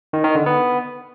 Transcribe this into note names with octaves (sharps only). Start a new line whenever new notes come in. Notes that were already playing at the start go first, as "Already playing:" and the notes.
D#3
D#3
D3
B3